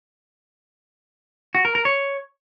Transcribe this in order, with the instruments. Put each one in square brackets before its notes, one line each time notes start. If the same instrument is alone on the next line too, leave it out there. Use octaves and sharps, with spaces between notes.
[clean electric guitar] F#4
A#4
A#4
C#5